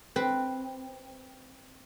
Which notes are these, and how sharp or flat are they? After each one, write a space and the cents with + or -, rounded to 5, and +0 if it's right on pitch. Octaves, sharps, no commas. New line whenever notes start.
C4 +0 B4 +0